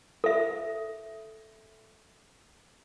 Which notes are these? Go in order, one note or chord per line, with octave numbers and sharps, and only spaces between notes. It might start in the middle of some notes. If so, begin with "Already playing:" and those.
A4 E5